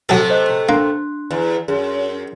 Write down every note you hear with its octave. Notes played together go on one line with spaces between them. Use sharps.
C3 F#3 A3 G#4 A4
C5 D#5 F#6
A#3 D4 C6 F#6
E2
F#2 G#4